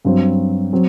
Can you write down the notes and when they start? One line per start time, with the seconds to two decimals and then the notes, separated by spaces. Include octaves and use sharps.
0.05 G2 F#3 C4
0.73 F#3 C4